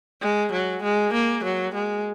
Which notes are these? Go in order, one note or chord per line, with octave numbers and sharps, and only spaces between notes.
G#3
F#3
G#3
A#3
F#3
G#3